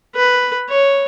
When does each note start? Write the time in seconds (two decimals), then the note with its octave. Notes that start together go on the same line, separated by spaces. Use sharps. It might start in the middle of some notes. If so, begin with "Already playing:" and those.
0.15 B4
0.69 C#5